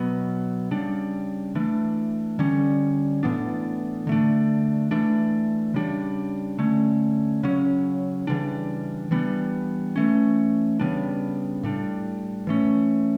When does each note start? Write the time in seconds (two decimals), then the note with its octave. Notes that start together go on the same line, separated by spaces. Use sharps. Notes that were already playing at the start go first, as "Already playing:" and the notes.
Already playing: B2 F#3 B3
0.71 C#3 G3 D4
1.55 E3 A3 D4
2.39 D3 G3 C#4
3.23 A2 E3 B3 D4
4.07 D3 A3 D4
4.91 E3 A3 D4
5.74 C#3 G3 D4
6.59 D3 A3 C#4
7.43 C#3 F#3 C#4
8.27 C#3 E3 G3 D4
9.11 E3 G3 B3 D4
9.96 E3 A3 C#4
10.80 C#3 G3 B3 D4
11.63 A2 G3 D4
12.47 E3 A3 C#4